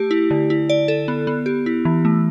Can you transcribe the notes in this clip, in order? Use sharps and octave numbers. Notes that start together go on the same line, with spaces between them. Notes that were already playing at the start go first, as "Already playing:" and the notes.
Already playing: A3 G4
E4
D3
E4
D5
A4
B3
B3
G4
E4
E3
A3